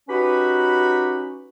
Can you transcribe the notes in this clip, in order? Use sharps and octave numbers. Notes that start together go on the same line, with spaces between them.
C#4 D#4 F#4 G4 B4 B5